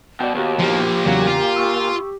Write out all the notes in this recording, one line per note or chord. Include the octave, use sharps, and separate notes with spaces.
B2 D5 G5
D#2 B3 F#4 G4
F3 A#3 G4
E2 A#2 C#3 F#3 F5
F4
C#6 E6